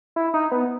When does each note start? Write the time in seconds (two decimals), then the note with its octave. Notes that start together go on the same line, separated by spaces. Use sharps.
0.16 E4
0.34 D#4
0.51 B3